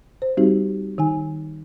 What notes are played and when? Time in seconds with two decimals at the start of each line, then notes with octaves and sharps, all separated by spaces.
0.22 C5
0.37 G3 C4 D#4 F#4 G4
0.98 D#3 D#4 G#5